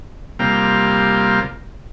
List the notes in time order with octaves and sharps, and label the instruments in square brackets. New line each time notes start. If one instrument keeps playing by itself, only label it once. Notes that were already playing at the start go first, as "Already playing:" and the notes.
[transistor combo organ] C3 G3 A#3 F4